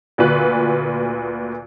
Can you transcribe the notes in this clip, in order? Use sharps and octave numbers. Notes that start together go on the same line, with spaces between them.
D2 A#2 F4 F#4 B4 F#6